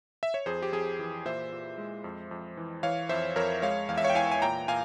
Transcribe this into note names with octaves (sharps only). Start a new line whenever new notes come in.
E5
C#5
F2 G#4 C5
G4
F2 G#4
E3
A#2 C5 E5
A#2
G#3
F2
F2
E3
E3 C#5 F5
F2 C5 E5
F2 A#4 C#5
G#3 C#5 F5
E2 F5
E5
C#5 F5
G5
E3 F5 G#5
G#5
A#2 G5 A#5
A#2 F5 G#5